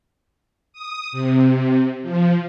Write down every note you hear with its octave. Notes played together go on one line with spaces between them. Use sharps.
D#6
C3
F3